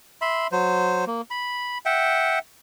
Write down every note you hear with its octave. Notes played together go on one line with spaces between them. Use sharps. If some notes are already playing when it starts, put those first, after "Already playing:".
E5 B5 C6
F#3 C5
A#3
B5
E5 F#5 G5